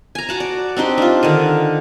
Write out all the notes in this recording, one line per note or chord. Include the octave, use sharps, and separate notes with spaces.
G#5 A#5
F#4 F#5 A5
D5
C4 D4 D#4 G4
D4 F4
D3 D#3